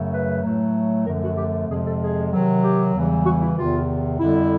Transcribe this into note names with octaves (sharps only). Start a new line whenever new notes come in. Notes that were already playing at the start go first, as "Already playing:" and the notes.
Already playing: F#2 C#3 F#3 A3
B4
A2 F#3 A3
F#2 D3 F3 A3 A#4
F#4
G4
F2 C3 F3 G#3 G#4
A4
G#4
C3 D#3 F#3
G4
E2 C#3 E3 G3
F#4
E4
E2 C3 D#3 F4
F2 D3 G3 E4